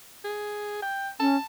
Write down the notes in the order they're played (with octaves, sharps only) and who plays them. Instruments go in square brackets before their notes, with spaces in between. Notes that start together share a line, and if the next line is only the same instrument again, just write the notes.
[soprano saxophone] G#4
G5
[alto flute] C#4 [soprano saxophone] A5